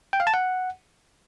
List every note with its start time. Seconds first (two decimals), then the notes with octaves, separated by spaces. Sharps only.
0.13 G5
0.20 F5
0.27 A5
0.34 F#5